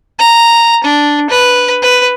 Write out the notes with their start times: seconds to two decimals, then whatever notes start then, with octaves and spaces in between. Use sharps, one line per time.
0.19 A#5
0.84 D4
1.30 B4
1.82 B4